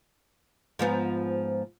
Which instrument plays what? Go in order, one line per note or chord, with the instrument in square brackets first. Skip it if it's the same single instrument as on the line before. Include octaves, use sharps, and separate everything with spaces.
[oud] G#2 F3 B3